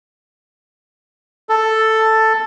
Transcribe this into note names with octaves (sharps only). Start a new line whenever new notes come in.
A4